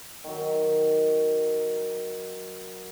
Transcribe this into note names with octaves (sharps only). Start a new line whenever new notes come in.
D#3 F#3